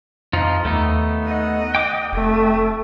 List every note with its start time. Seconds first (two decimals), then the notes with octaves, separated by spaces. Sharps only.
0.33 F2 F3 D#4 F4
0.65 D#2 A3 B3 D#4
1.24 D#5 F#5
1.75 G5 D6 D#6
2.13 F1 A3